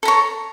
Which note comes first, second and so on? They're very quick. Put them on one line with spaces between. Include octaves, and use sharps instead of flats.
A4 A#5 C#5